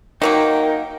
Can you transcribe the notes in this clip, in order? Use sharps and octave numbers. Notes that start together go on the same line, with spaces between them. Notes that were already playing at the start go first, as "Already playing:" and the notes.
D#3 F#3 A#3 D#4 A#4 G5